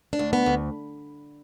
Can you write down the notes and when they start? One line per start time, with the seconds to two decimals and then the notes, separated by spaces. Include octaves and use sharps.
0.13 D4
0.19 D2
0.33 B3
0.46 D2